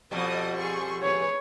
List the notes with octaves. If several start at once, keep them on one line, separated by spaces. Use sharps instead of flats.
F2 B2 G3 D#5 D#6
G#4 C6 C#6
G#4 B4 C#5